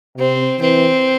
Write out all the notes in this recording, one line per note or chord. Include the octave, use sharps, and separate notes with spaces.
C3 C4
E3 C4